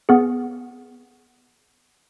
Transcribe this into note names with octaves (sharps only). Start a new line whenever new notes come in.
B3 G#4